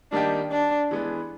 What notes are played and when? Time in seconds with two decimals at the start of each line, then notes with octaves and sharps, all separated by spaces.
0.12 D#3 G3 A#3 D4 D#4 G4
0.51 D4
0.91 E3 G#3 B3